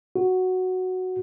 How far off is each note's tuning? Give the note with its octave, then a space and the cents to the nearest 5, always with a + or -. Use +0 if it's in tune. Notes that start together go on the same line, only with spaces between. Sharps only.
F#4 +0